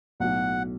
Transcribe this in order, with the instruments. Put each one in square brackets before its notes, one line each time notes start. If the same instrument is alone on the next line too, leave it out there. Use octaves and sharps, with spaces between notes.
[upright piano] B1 A2 F#3 [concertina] F#5